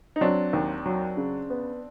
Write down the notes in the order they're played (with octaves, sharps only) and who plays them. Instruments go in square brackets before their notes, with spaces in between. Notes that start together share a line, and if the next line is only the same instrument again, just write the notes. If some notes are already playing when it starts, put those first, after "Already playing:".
[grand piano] D#4
[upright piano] F#3 [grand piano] C4 D4
[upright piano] D#2
F#3
C#3
B3